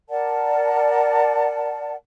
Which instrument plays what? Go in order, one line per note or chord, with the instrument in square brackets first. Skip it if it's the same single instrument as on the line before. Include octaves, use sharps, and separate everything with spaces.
[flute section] A#4 D5 F#5 A5